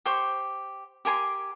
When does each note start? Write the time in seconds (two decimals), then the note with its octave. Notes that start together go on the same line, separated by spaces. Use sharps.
0.06 G4 C5 C#6
1.05 G4 A#4 G#5 C6